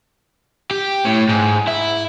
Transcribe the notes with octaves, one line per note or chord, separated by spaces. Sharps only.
G4
A2
G#2
E4